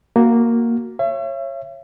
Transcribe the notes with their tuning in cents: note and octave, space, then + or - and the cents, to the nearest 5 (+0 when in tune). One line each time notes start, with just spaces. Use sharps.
A#3 +0 F#4 +0
C#5 -20 E5 +40